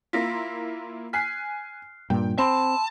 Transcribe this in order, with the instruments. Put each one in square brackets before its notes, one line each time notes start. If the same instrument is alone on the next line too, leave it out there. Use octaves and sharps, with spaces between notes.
[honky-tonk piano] A#3 E4 F4 [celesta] C6 A#6 B6
[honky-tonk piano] G#5 F#6 B6 [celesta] F6 C7
[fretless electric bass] G2 A#2 [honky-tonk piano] G5
[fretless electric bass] C4 [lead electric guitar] A5 [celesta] B5 C6 E6 [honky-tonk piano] E7